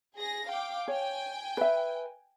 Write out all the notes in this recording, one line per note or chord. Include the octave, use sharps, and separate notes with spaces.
G#4 A#6
F5 G5 D6
C#5 G5 G#5
B4 E5